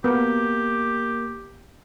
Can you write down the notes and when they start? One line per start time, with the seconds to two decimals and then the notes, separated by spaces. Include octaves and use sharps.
0.04 A#3 B3 G4 A#4